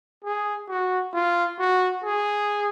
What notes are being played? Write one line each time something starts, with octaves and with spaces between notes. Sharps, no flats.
G#4
F#4
F4
F#4
G#4